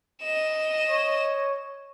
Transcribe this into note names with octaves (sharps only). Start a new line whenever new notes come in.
D#5 E7
C#5